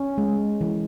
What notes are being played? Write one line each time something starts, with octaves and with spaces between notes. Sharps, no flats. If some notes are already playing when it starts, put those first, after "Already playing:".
Already playing: C#4
G#3
E3